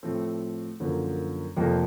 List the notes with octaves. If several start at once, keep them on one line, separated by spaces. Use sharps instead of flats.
A2 F3 A3 C4
F#2 D3 F3 A#3
F1 F2 C3 F3 A#3